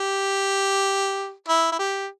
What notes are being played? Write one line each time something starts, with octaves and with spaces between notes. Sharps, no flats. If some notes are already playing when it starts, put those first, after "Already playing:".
Already playing: G4
E4
E4
G4